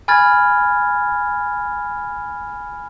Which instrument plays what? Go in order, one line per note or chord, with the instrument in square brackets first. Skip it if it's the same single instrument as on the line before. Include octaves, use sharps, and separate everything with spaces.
[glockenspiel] G#5 B5 F6 G#6 A6